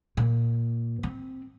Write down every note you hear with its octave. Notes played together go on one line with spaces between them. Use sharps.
A#2
C4